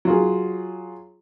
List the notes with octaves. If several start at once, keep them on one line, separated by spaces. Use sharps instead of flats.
F#3 F4 G#4